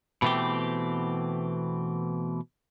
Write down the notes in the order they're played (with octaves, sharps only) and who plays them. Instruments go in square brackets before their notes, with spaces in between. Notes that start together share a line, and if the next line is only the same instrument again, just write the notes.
[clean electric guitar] B2 E3 A3 C4 G4